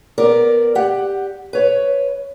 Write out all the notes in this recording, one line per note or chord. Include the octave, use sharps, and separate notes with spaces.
B3 A#4 D5
G4 F#5
B4 C#5